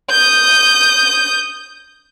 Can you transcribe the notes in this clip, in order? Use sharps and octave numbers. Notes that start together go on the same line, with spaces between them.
D#6 G6